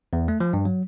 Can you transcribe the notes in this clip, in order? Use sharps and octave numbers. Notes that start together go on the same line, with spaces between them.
E2
A3
F3
G2
F#3